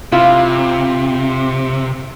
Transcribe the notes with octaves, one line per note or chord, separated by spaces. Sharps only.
C3 E4 F4